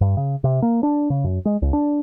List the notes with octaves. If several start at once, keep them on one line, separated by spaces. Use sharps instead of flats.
G2
C#3
C3
A#3
D4
C#3
F#2
G#3
C#2
D4